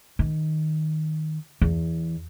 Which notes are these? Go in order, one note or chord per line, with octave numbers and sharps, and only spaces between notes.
D#3
E2